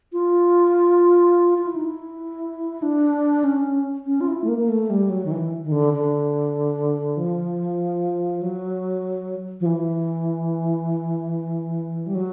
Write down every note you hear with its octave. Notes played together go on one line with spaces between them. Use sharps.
F4
F4
E4
D#4
E4
D4
C#4
C#4
F4
E4
A3
A#3
A#3
A3
G3
F#3
D#3
E3
D#3
D3
D3
F3
F#3
F3
E3
G3
F#3